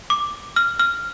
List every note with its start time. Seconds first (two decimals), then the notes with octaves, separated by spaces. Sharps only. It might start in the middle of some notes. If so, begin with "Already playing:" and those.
0.10 D6
0.56 F6
0.79 F6